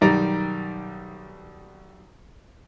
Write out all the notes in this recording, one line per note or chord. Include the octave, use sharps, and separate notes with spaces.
B1 D#3 G3 D5 A#5